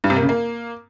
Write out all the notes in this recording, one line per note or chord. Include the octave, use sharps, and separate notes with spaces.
G2
C3
A#3
C#3
A#3